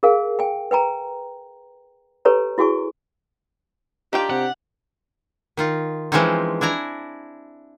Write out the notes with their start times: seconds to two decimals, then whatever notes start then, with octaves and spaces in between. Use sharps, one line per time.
0.03 G#4 A#4 F5 G#5
0.39 G5 G#5
0.71 B4 G5 G#5 A#5
2.25 G4 A4 B4 C#5 G#5 A#5
2.58 E4 F#4 G#4 G#5 C#6
4.13 D#3 D4 F4 G4 G5
4.30 C3 F#5
5.57 D#3 D#4 F4
6.12 E3 F3 G#3 C4 C#4 D#4
6.61 D4 E4 G#5 A#5